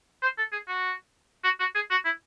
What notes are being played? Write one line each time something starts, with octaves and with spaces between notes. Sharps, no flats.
C5
A4
G#4
F#4
F#4
F#4
G#4
F#4
E4